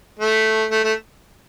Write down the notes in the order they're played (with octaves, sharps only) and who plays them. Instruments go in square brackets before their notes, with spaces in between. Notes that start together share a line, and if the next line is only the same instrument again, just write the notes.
[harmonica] A3
A3
A3